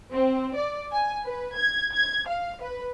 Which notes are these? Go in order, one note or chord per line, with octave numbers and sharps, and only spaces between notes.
C4
D5
G#5
B4
G#6
G#6
F5
B4